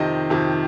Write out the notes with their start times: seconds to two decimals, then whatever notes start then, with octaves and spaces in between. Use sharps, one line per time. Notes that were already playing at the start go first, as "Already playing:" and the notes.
Already playing: F2 C3 D#3 D#5
0.30 F2 C3 D#3